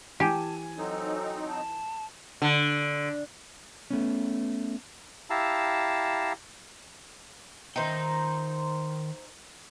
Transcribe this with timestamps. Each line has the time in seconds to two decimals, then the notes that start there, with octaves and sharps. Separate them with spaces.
0.20 E3 G4 G#5 A5
0.77 F#3 C4 D#4 A4
1.48 A5
2.42 D3
3.90 A3 B3 C#4
5.30 E4 G4 F5 A5 A#5 E6
7.76 D#3 D#4 C5 E5 G5